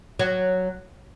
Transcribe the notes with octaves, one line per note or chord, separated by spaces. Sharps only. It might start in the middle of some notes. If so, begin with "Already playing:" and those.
F#3